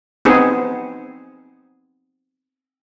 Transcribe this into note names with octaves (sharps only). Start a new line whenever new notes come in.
B3 C4 D#4 G#4